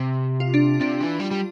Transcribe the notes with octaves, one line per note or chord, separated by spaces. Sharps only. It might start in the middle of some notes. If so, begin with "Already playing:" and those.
Already playing: C3
F4
D4
C3 D4
E3
G3
G3